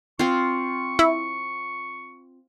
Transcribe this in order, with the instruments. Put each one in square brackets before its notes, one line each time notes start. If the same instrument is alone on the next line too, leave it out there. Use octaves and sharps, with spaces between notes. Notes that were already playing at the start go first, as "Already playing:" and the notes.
[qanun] C4 F4 [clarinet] C#6
[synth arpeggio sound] E4